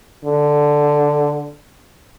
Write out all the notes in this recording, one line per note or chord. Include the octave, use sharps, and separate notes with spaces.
D3